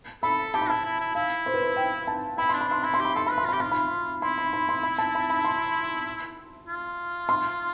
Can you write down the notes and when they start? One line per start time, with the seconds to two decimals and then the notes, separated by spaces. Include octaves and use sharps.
0.23 A4 B5
0.54 G4 A5
0.62 B5
0.70 E4 A5
0.85 E4
1.00 E4
1.15 E4 F5
1.46 C5
1.54 B4
1.62 C5
1.76 G5
2.07 A5
2.38 E4 B5
2.49 D4 C6
2.61 B5
2.69 D4 C6
2.83 E4 B5
2.94 C6
3.00 G4 B5
3.15 A4 C6
3.27 B4 B5
3.38 C6
3.45 F4
3.49 G4 B5
3.60 F4 C6
3.71 B5
4.22 E4 C6
4.38 B5
4.53 B5
4.69 C6
4.83 B5
4.98 A5
5.15 B5
5.30 B5
5.44 C6
6.67 F4
7.29 C6